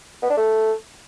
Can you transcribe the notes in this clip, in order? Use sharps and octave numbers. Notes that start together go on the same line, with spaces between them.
B3
D4
A3